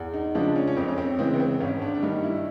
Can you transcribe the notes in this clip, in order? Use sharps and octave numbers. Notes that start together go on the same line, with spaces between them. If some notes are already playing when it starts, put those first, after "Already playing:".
Already playing: E2
D#4
C#3 F3 G#3 D4
C#4
C#4
F2 C4
C#4
C4
C#3 E3 G#3 C4
B3
C4
G#1 C#4
D4
D4
G2 D#3 G3 D#4
E4